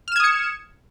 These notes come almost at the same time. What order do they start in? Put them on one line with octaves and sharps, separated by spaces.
F6 E7 G#6 D#6 C#7